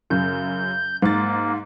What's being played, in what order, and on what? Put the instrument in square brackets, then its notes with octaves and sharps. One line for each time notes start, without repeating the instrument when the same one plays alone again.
[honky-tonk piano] F#2 C#3 [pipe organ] G6
[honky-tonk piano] G#2 A6 [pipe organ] A#3